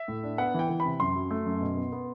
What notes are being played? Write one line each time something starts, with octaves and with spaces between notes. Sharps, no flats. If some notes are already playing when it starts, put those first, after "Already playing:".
Already playing: E5
A2
D4
B3 F#5
E3 G5
E3
B5
C3
F#2 C6
F#3
A3
F#2
B2
B3
B3